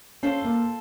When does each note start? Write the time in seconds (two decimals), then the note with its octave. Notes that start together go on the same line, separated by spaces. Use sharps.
0.23 C#4 F4 A4 C5
0.44 A#3